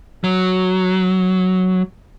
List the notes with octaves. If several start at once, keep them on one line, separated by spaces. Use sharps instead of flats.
F#3